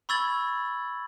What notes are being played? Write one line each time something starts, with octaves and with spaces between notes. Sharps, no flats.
B5 C#6 E6 G#6 A6 F#7